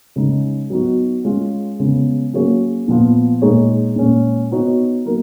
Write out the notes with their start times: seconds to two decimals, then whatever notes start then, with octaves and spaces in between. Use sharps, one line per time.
0.16 C#3 G#3 D#4
0.70 F#3 B3 D#4 F#4
1.24 G#3 C#4 F4
1.79 C#3 G#3 B3
2.33 F#3 A#3 C#4 G#4 C#5
2.88 A#2 F3 B3 F4
3.42 A#2 G#3 D#4 G#4 C#5
3.96 A#2 G#3 C#4
4.51 B3 D#4 F#4 C#5
5.05 F#3 A#3 D#4 A#4